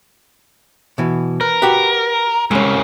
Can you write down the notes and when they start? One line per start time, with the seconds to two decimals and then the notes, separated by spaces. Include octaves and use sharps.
0.98 B2 E3
1.41 A#4 B4
1.62 F#4 G4 B4
2.51 C2 C#3 G#3 C#4